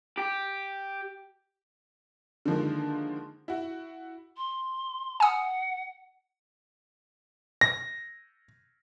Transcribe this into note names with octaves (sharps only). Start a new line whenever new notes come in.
G4
D3 D#3 F3 G#3 A#3
E4 F#4
C6
F#5 G#5 D#6
A#6